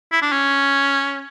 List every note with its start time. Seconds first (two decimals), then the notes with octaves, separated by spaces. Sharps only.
0.12 E4
0.22 D4
0.32 C#4